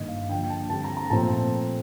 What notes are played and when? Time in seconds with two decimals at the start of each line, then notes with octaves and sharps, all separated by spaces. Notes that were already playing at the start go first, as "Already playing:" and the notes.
Already playing: G2 D#3 A#3 D#5
0.08 F5
0.29 D3 F3 A#3 D4 G5
0.50 A5
0.70 D3 G3 C4 A5
0.84 A#5
0.97 A#5
1.10 A#2 F3 A3 C4 A5